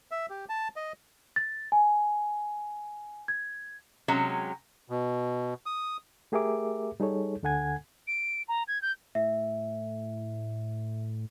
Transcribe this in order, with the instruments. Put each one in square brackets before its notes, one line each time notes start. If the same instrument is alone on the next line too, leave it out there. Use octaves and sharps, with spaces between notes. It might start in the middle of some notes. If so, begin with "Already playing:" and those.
[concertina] E5
G4
A5
D#5
[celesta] A6
G#5
G#6
[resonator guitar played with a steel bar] C3 F#3 G#3 C#4
[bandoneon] B2
D#6
[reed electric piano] A3 G4 G#4 A#4 E5 D6
G3 D#4 G#4 A4 C#5
D2 D3 A4 F#5 G#5 G#6
[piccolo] D7
A#5
G#6
G6
[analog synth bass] A2 [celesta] E5